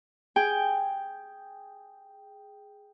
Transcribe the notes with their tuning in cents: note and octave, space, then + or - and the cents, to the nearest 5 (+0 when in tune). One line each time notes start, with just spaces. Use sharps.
G#4 +0 G5 +0